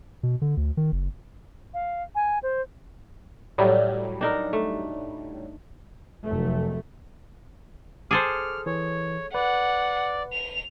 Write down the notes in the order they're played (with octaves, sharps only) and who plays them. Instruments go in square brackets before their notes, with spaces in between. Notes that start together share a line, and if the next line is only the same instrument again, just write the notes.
[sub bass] B2
D3
D2
D#3
F#1
[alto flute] F5
G#5
C5
[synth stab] A2 F#3 G3
[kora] D4 D#4 A#4
A3
[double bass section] F1 F#3 A3
[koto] G#4 A4 C5 [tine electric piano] D6 [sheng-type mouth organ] F6
[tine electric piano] E3 [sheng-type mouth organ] C#5
[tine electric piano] B4 [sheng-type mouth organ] D5 [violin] F#5
[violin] F7